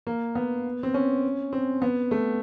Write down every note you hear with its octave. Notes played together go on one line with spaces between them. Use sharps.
A#3
B3
C4
C#4
C4
B3
A3